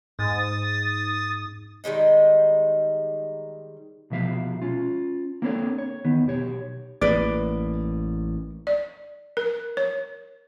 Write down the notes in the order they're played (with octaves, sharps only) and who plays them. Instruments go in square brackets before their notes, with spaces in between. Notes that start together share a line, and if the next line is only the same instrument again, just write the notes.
[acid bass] G#2 [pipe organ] D#6 A6
[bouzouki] D#3 G3 G#3 D#4
[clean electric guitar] C2 B2 F3 E5 F5
C#4 F4
A#3 C4 D4 A4 A#4 C#5
C#5
E2 D#3 B3
B1 G4 C#5
[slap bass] A1 A#3 [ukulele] B4 D5
[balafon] D5
A#4
C#5